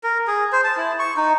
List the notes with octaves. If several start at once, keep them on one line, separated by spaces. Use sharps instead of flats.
A#4
G#4
C5
A5
E4
C#6
D#4